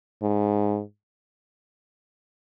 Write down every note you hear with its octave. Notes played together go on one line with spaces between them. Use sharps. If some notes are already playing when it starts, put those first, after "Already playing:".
G#2